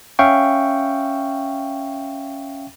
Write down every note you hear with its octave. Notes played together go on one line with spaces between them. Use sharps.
C#4 E5 F5 G5 C#6